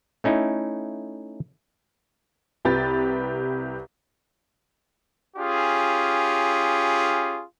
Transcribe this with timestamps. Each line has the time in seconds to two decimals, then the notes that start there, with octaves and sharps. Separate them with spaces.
0.24 A3 C#4 D#4 E4
2.65 C2 G4 B4 A6
5.37 C#4 F4 G4 G#4